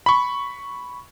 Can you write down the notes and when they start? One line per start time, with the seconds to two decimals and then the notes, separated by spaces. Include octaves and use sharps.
0.06 B5 C#6